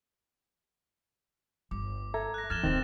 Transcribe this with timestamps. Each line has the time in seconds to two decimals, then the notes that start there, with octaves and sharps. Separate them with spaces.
1.71 G1 D6
2.14 A4 E5 A#5 G#6
2.34 F#6 A#6
2.50 F2 F6 G#6 A6 E7 G7
2.63 D1 D#2 D#3 C4